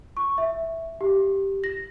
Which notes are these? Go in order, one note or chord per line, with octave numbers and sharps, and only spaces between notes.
C#6
E5
G4
A#6